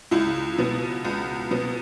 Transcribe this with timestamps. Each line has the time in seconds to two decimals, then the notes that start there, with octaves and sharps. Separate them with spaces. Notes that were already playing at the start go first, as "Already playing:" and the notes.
0.11 C#2 E4
0.59 B2 B3
1.05 C#2
1.51 B2 B3